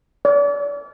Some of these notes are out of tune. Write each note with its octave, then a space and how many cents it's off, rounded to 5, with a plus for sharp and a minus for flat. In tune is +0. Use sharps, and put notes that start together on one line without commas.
D5 -35